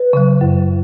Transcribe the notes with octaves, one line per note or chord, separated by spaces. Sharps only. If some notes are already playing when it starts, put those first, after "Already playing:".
Already playing: B4
C#3 F#3
F#2